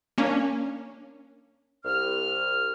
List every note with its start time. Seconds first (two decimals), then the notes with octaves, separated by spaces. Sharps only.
0.18 A#3 C#4 D4
1.84 C2 F6